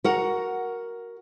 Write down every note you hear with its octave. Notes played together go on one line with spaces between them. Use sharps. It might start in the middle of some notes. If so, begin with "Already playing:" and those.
F#4 A#4 F#5